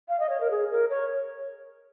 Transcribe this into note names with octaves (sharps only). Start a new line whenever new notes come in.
F5
D#5
C#5
A#4
G#4
A#4
C#5